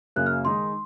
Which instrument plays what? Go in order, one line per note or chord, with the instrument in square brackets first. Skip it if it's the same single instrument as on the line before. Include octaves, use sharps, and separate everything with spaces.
[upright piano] F#2 C#3 F#3 A#3 [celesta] F#6
[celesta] F6
[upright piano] D#3 G#3 D#4 [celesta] C6